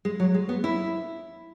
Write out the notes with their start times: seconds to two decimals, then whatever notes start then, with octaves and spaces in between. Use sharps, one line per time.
0.05 G#3
0.20 F#3
0.34 G#3
0.49 B3
0.64 E4